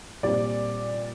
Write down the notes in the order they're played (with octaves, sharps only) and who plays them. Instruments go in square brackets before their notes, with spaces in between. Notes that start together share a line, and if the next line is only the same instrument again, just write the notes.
[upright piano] A#2 G3 C4 D5